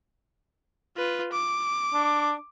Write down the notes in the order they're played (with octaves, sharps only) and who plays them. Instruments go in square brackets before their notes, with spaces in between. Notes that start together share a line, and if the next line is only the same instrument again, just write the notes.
[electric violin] F4 B4
D6
[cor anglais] D4